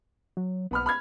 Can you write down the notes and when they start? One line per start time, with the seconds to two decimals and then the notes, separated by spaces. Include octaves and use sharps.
0.37 F#3
0.71 B1 B3 B5 F6
0.86 B5 F6 G#6